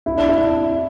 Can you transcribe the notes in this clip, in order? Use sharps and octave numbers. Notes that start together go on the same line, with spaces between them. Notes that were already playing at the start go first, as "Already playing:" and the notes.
E4
D4
E4